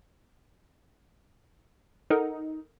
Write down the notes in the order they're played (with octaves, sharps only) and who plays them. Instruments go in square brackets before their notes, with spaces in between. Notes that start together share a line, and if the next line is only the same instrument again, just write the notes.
[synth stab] D#4 [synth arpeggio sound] A4 A#4 F#5